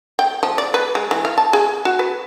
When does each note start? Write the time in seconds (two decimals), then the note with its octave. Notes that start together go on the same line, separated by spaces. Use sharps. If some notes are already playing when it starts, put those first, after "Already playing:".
0.19 G5
0.43 F3
0.58 D5
0.74 B4
0.95 G#3
1.11 E3
1.25 F5
1.38 A5
1.53 G#4
1.85 F#4
1.99 B4